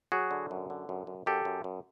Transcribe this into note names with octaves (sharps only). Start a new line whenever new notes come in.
F#3 F#4 G#4
D3
F#2
D3
F#2
F#2
F#2 G4 A4
F#2
F#2